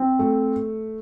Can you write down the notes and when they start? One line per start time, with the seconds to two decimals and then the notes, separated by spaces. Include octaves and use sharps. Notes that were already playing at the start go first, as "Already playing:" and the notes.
Already playing: C4
0.19 A3